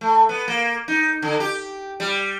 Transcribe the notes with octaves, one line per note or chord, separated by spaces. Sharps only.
A3
B3
A#3
D#4
D3
G4
G3